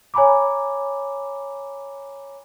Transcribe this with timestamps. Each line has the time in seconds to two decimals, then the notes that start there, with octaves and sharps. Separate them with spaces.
0.14 C#5 G#5 A#5 B5 D6